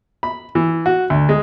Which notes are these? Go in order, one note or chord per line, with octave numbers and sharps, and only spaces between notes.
B5
E3
F#4
D2
G#3